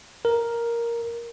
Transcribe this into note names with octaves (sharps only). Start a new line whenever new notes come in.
A#4